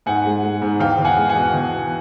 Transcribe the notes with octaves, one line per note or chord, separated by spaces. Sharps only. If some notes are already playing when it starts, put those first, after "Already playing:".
G#2 F#5 G#5
G#3
G#3
G#2
E2 F5 G5
E2
F#5 G#5
G#3
F#5 G#5
B2
E2
B2